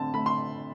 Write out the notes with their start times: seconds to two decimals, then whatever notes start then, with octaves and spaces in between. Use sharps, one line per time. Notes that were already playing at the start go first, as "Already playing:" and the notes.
Already playing: D3 A3 C4 A5
0.14 A3 B5
0.26 C6